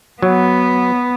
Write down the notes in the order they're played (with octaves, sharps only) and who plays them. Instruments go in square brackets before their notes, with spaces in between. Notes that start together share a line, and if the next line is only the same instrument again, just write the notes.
[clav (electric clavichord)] F#3 [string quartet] B3